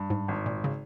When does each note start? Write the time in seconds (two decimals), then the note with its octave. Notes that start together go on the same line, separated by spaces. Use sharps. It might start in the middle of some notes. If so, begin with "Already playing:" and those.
Already playing: G2
0.10 G#2
0.28 G#1
0.46 A#2
0.64 C#3